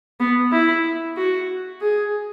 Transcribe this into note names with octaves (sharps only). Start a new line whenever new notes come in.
B3
E4
F#4
G#4